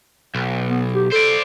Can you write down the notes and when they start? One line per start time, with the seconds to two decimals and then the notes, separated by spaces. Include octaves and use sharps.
0.35 B1
0.68 B3
0.93 G4
1.12 A4 C5 D5